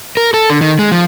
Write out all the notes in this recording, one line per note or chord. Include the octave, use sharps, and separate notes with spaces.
A#4
A4
D3
D#3
G#3
F3